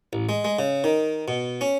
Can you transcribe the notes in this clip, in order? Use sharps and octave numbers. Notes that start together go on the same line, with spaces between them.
A1
G#3
G#3
C#3
D#3
B2
C#4